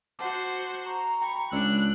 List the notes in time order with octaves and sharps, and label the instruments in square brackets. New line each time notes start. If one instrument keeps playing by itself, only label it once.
[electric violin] F#4 C5 [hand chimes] F#5 A5 D6
[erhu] A#5 [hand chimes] C#6
[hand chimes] G5 B5 [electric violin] C#6
[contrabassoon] C#2 [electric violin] D4 [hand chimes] D5 E6 [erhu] F#6